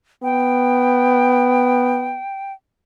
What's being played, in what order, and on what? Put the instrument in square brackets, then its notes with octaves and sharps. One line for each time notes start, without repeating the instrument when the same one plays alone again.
[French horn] B3 [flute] G5